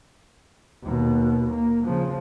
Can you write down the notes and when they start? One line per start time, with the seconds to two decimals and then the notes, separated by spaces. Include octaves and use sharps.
0.84 D#2 B2
1.51 A#3
1.84 C#3 F3